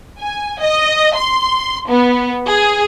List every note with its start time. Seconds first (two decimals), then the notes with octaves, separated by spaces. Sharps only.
0.20 G#5
0.61 D#5
1.16 C6
1.89 B3
2.48 G#4